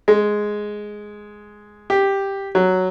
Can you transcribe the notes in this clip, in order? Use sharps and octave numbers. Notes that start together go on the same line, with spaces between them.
G#3
G4
F#3